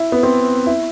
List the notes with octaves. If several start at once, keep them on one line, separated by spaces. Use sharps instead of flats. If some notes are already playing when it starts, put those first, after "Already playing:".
Already playing: E4
B3
C4
E4